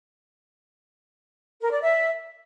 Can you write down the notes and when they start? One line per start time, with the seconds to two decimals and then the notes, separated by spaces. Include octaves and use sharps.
1.61 A#4
1.71 D5
1.82 E5